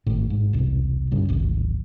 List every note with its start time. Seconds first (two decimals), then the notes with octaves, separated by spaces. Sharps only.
0.06 G#1 A2
0.30 G#2
0.53 E1 C2
1.11 F#1 G2 C#3
1.29 D1 G#1